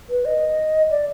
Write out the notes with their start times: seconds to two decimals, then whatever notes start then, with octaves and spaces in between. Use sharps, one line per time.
0.10 B4
0.25 D#5
0.90 D5